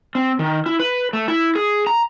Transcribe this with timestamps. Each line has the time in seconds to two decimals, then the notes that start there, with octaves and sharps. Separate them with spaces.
0.15 C4
0.39 D#3
0.66 E4
0.80 B4
1.13 A3
1.28 E4
1.56 G#4
1.87 A#5